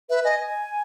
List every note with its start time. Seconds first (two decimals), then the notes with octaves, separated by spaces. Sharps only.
0.09 B4 E5
0.24 D#5 G#5